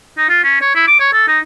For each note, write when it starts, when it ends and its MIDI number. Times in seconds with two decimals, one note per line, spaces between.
0.18 0.26 63
0.29 0.39 65
0.44 0.58 61
0.61 0.74 73
0.75 0.84 64
0.87 0.99 86
1.00 1.10 73
1.13 1.25 69
1.28 1.39 63